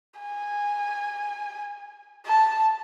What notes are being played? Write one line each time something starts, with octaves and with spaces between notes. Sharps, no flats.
G#5
A5